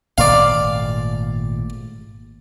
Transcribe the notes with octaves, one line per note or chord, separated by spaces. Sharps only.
G#1 A#2 A3 D5 F5